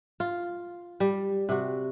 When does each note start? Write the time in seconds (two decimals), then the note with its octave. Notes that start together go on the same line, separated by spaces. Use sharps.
0.20 F4
1.00 G3
1.49 C3 F#4